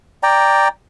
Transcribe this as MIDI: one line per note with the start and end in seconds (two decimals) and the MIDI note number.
0.23 0.68 74
0.23 0.68 79
0.23 0.68 82